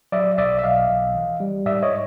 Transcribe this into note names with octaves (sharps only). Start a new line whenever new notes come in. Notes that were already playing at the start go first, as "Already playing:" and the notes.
F#3 D5 E5
B1 D5 E5
E5
B1 D#5 F5
B1
E3
G3
G#2 D5 E5
C#5 D#5